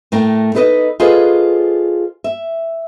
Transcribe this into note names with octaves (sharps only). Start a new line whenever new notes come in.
A2 A3 A#4 G5
D#4 A4 B4 C#5 D#5
F4 G#4 A4 B4 C5 D#5
E5